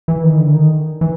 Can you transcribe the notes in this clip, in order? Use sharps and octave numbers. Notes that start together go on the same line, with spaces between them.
E3
D#3
D3
D#3
E3